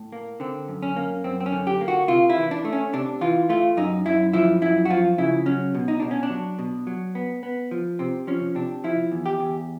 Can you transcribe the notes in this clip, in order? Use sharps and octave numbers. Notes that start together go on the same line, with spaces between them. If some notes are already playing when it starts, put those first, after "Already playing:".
Already playing: A2
A#3
D3 C4
F#2
C#4
A#3
F#2 C4
C4
C#4
D3
G4
A#3
F#4
C3 F4
E4
E3
D4
A3
C#4
C3 D4
E3 F4
A3 F4
F#2 D#4
F#2 E4
F3 E4
F#2 E4
F#4
F3 F4
C#3 E4
F#3 C#4
B2
D#4
B2 D4
C#4
D4
F#3
B2
F#3
B3
B3
F3
C3 C4
F3 C#4
C3 D4
F3 E4
E2
G4
E2